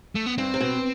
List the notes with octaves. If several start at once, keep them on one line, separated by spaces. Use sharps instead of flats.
A3
B3
G2 C4
C3
B2